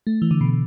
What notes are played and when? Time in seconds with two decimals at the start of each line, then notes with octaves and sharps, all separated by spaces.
0.07 A3
0.22 E3
0.31 D3
0.41 B2